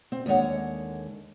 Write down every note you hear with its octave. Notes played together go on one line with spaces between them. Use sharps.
C4
D#2 D3 G#3 C#5 F#5